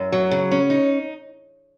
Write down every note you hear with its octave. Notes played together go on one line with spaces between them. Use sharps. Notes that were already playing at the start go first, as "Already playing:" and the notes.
Already playing: F#2
F#3
C#3
C#4
D#4